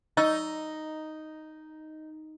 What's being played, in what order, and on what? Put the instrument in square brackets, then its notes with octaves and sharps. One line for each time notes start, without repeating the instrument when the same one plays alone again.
[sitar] D#4 [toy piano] D#5 C#6 E6